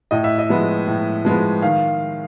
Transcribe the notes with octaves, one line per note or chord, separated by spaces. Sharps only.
A2 D#5
E5
D#5
F3 G#3 B3
A2
F3 G#3 B3
D#3 F5